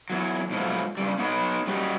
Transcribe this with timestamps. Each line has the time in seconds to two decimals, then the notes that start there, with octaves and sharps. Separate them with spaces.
0.10 E2 F#3
0.50 G#2 B2 F3 F#3 A3
0.97 G2 C#3 G3
1.18 B3 D#4 F#4 G4 B4 C#5
1.67 G3 C#4 F#4 G4 D#5